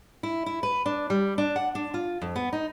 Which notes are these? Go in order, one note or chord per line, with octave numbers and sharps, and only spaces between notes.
E4
E4
B4
D4
G3
D4
F#5
D4
F4
F2
B3
D#4